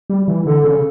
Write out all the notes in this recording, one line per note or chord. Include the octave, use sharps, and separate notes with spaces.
G3
E3
D3 A4
C#3